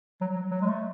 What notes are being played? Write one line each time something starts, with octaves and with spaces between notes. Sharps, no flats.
F#3
F#3
F#3
G#3
A3